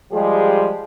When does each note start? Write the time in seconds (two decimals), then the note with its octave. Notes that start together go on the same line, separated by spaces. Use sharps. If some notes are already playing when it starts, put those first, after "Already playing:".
0.12 F3 G3 G#3 G4 G#4